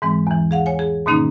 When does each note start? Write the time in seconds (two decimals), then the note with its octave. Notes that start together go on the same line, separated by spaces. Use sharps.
0.02 G#2 E3 G#3 C4
0.27 E2 E3
0.51 G#4 F5 F#5
0.66 C#5 G#5
0.79 G#4
1.06 G#2 B2 D#3 A#3 C#4 D#4